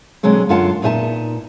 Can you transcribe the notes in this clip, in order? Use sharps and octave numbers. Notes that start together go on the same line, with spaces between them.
B2 D3 F#3 G#3 C4
F#2 D3 F4 F5 F#5 A5
A#2 B3 D#4 E5 G#5 A5